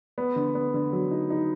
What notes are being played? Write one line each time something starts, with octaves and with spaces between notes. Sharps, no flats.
B3
D3
B3
D3
F#3
D#4
D#4